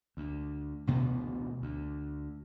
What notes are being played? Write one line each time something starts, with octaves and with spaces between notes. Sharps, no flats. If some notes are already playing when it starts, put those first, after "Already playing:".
D2
A1 D2 B2 B3
D2